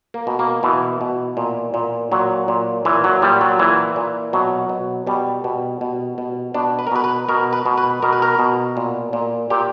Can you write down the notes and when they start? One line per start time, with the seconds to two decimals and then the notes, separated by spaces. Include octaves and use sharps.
0.14 A#3
0.27 B2
0.39 A#3
0.63 B2 E3
1.01 B2
1.37 A#2
1.74 A#2
2.12 A#2 F#3
2.48 A#2
2.85 A#2 E3
3.04 F#3
3.22 A#2 G3
3.41 F#3
3.59 A#2 E3
3.96 A#2
4.33 B2 F#3
4.69 B2
5.07 B2 G3
5.44 B2
5.81 B2
6.18 B2
6.54 B2 D4
6.79 B4
6.87 A#4
6.92 B2 B4
7.04 B4
7.29 B2 A#4
7.53 B4
7.66 B2
7.78 B4
8.02 B2 A#4
8.13 B4
8.22 A#4
8.39 B2
8.77 A#2
9.13 A#2
9.50 A#2 G4